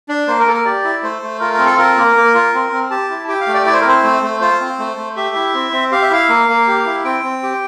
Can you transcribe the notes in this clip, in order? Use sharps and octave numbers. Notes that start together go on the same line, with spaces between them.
D4
A#3 C5
A#4
A#3 A4
A#4
G4 D5
E4
A3 C5
A3
F4 A#4
A#4
C4
A4
F4 A#4
A#3
A#3
F4
C4
C4
G4 A5
E4
G4 G5
F5
A3
D5
E4 D5
C5
A#4
C4 C5
A3
A3
F4 C5
C4
A3
A3
G4 E5
E4
C4
C4
G4 F5
E5
E4 F5
A#3
A#3
G4
E4
C4 G5
C4
G4